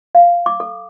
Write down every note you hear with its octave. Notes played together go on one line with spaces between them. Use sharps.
F5
D6
A4